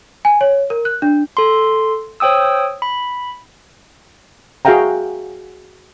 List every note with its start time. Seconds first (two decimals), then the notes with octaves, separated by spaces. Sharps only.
0.25 G#5
0.41 C#5
0.70 A#4
0.85 F#6
1.02 D4
1.37 A4 C6
2.20 C5 C#5 G5 D#6 E6
2.82 B5
4.65 F#4 G#4 E5 F5 G5 A#5